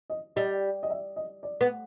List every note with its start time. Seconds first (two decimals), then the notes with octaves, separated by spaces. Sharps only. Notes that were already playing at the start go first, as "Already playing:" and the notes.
0.10 D#5
0.36 G3 D#5
0.83 D#5
0.90 E5
1.16 D#5
1.43 D5
1.61 B3